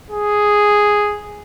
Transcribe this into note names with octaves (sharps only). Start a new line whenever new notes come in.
G#4